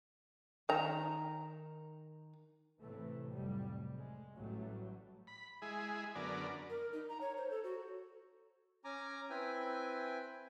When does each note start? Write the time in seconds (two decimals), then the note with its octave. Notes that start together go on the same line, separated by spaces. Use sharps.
0.69 D#3 A#5
2.82 A2 C3 E3 A3
3.30 F1 A2 F#3 G3
3.97 G#3
4.37 A1 F#3 G3 A3
5.27 B5
5.62 G#3 E4 G#4
6.15 F#2 D3 B3 A#4 D5
6.70 A#4
6.93 D#4
7.09 A#5
7.21 C#5
7.37 C5
7.51 A4
7.64 F#4
8.84 C#4 G#5 A#5 D6
9.30 C4 E4 B4 G5 G#5